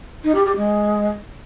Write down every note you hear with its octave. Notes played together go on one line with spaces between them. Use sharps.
D#4
G4
G4
G#3